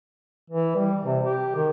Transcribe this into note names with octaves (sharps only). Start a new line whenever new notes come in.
E3
G3
C3
G4
D#3